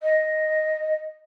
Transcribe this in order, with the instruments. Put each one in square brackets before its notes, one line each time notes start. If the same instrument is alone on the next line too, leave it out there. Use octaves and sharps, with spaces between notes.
[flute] D#5